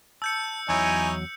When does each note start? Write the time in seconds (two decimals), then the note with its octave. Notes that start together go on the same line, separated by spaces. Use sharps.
0.22 A5 E6 G6 C#7
0.69 E2 F#3 D#4 E4 C#5 G#5